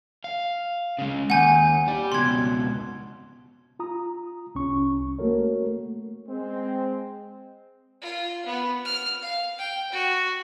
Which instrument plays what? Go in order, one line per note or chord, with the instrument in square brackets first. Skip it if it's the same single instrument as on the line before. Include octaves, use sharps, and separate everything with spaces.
[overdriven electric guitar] F5
C#3 G#3
[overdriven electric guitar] D#2 [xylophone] F#5 G#5 G6
[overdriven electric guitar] G4 D5
[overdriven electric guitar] C#2 B2 [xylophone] C6 G#6
[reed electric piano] F4 A#5 D#6
C2 C#4 C#6
A3 A#3 F#4 A4 A#4 C#5
[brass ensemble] G#3 C4
[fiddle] F4
B3
F6
F5
G5
F#4